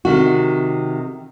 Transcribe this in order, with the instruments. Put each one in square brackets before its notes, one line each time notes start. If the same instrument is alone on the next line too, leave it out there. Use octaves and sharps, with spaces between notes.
[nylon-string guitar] C3 D#3 F#4